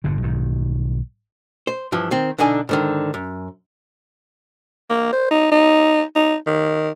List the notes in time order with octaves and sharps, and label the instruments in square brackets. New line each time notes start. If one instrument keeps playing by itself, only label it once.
[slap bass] G1 A#2 D3
B1 G#2 D#3
[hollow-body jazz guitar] C5
G2 E3 F3
D#3 C4
B1 D3 D4 D#4 G#5
G#2 D3 D#3
F#2
[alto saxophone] A#3
C5
D#4
D#4
D#4
D#3